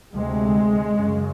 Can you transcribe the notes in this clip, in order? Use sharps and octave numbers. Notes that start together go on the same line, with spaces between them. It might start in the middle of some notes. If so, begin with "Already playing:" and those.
D2 C3 G#3
F#2 C#3